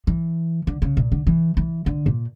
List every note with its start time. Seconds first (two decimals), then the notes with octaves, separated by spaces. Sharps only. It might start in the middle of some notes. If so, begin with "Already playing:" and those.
0.07 E3
0.67 D3
0.82 C#3
0.97 A#2
1.12 D3
1.27 E3
1.57 E3
1.86 D3
2.06 A#2